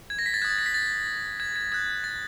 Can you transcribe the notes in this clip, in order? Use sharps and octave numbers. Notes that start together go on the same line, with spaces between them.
G#6
A#6
B6
A6
D#6 F#6 G#6
A6
A#6
B6
A6
G#6
G#6
D#6 F#6 G#6
A6